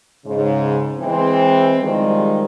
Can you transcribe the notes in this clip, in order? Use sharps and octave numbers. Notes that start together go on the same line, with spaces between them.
G#2 C#3
E3 G#3 C4
D#3 F3 G3 G#3